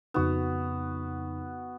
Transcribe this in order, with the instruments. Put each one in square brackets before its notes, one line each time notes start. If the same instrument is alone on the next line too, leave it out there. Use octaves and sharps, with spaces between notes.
[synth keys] F2 C#3 D#4 [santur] B3 F#4